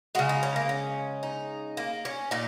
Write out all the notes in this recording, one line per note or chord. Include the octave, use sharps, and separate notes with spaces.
C#3 G#3 F#4
D#4
C#4
A#3
C#4
D#4
A#3
C#4
A#2 D#4